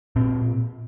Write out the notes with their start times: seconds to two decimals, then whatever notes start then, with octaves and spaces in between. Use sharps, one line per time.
0.16 A#2 C4